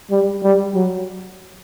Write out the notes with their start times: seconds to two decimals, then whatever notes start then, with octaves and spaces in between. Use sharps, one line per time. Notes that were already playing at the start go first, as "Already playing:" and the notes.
0.10 G3
0.43 G3
0.74 F#3